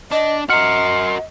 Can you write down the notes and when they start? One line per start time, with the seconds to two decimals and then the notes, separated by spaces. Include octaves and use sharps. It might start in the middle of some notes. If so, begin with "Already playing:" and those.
0.11 D4 D#5
0.50 F#4 A#4 D#5 C6 F6 C#7